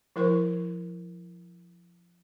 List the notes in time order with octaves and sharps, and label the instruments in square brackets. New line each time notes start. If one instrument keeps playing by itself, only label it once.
[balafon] F3 E4 A#4 C5 C#6